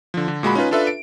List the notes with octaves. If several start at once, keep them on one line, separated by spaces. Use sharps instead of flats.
D3 F3
D3
A#2 G#3 F#4 B5
C#4 D#4 F4 B4
D4 F4 A4 B4 E5
D7